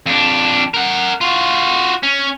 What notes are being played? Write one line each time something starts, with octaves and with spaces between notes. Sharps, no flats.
F2 D4
A#4 F#5
F4 F#4
C#4